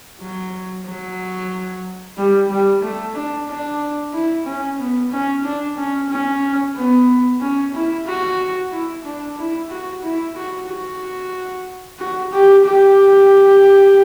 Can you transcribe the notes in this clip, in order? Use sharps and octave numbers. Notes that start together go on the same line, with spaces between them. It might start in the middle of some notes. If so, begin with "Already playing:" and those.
F#3
F#3
G3
G3
A3
D4
D4
E4
C#4
B3
C#4
D4
C#4
C#4
B3
C#4
E4
F#4
E4
D4
E4
F#4
E4
F#4
F#4
F#4
G4
G4